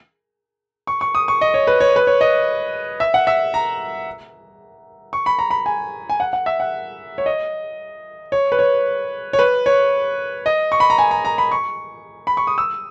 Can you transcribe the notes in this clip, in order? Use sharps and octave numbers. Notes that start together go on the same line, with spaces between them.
C#6
C#6
D#6
C#6
D#5
C#5
B4
C#5
B4
C#5
D#5
E5
F#5
E5
A#5
C#6
B5
A#5
B5
G#5
G#5
F#5
F#5
E5
F#5
C#5
D#5
C#5
B4
C#5
C#5
B4
C#5
D#5
C#6
B5
A#5
G#5
A#5
A#5
B5
C#6
B5
C#6
D#6
E6